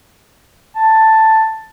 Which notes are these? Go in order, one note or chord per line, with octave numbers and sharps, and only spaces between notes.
A5